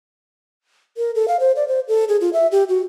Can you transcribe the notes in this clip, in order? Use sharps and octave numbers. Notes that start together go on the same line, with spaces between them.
A#4
A4
F5
C5
D5
C5
A4
G#4
F4
E5
G4
F#4